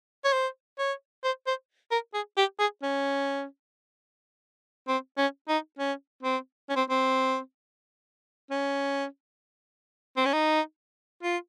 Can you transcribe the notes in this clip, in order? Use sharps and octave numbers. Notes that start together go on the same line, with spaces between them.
C#5
C5
C#5
C5
C5
A#4
G#4
G4
G#4
C#4
C4
C#4
D#4
C#4
C4
C#4
C4
C4
C#4
C4
C#4
D#4
F4